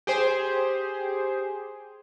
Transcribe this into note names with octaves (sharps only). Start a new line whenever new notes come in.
G4 G#4 C5